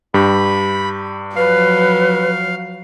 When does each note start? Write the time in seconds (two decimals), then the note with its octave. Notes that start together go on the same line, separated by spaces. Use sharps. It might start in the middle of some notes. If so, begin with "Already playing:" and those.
0.14 G2 G4 B5
1.36 F3 F#3 B4 F5